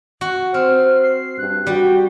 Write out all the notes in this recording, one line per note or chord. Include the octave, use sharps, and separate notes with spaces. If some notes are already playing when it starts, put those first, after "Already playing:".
F#4
C4 C5 F6
C7
G2 F#6
G3 F#4 G5